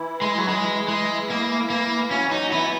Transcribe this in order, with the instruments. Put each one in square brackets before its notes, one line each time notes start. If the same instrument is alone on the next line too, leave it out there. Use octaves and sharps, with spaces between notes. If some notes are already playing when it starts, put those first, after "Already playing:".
Already playing: [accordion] E3 E4
[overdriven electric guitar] G#3
F#3
G#3
G#3
A#3
A#3
[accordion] F#3 F#4 [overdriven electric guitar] C#4
[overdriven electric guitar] D#4
[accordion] F#4
[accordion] E3 E4 [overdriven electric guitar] B3